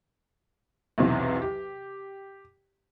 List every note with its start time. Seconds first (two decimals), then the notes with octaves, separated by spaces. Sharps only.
0.98 B1 E2 C3 E3 F#3
1.42 G4